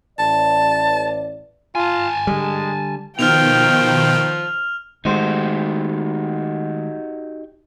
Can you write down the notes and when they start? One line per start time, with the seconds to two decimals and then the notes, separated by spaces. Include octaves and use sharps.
0.19 A1 D5 A5
1.75 F4 G#5 A5
2.27 D3 G3 G#3
3.19 B2 D#3 F3 G5 F6 F7
5.05 D#3 G#3 A3 D#4 F#4 G4 C5